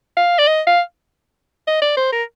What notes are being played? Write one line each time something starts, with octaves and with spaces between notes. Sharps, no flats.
F5
D5
D#5
F5
D#5
D5
C5
A#4